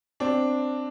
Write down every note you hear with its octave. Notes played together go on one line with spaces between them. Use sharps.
C4 D4